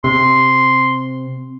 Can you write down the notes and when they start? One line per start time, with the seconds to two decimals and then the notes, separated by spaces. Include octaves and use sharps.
0.04 C3 C6